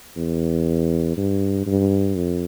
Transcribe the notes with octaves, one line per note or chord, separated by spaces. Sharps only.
E2
G2
G2
F2